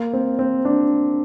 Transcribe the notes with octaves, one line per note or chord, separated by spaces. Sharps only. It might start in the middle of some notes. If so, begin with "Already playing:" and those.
Already playing: A#3
C4
C4
D4